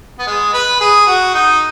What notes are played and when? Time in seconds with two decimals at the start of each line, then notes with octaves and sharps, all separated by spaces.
0.19 B3
0.27 G#3
0.54 B4
0.81 G#4
1.07 F#4
1.34 D#4